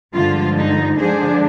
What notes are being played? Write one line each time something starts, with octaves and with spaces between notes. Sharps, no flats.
G2 D3 F3 G#3 F4
D#4
D3 F3 G#3 D4 G#4 C5